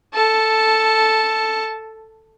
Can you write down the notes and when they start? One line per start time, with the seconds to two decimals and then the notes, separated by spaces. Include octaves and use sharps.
0.14 A4 A5